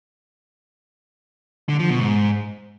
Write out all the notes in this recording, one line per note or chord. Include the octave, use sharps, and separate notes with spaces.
D3
F3
B2
G#2